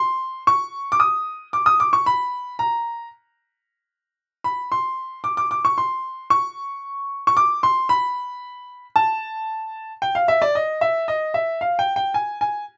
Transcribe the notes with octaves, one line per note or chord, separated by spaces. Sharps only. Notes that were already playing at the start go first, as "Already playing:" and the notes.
Already playing: C6
C#6
D6
D#6
D6
D#6
D6
C#6
B5
A#5
B5
C6
D6
D6
D6
C#6
C6
C#6
C#6
D6
C6
B5
A5
G5
F5
E5
D5
D#5
E5
D#5
E5
F5
G5
G5
G#5
G#5